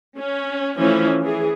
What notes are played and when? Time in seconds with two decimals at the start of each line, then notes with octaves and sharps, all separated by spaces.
0.18 C#4
0.77 E3 F3 A3 C#4 E4
1.22 E3 G#4